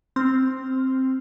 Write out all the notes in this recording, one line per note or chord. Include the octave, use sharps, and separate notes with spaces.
C4 C6 F6